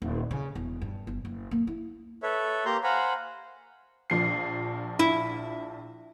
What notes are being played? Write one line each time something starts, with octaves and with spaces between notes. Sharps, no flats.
D#1
C#3
E1
G2
G1
F#1
A#3
E4
A4 B4 C#5 E5
A#3 G4 A#5 C6 G6
C5 F5 F#5 G#5 A#5 B5
A#1 F3 C7
E4